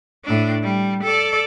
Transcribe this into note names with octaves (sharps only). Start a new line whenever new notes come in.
A2 D4
G3
A4 D5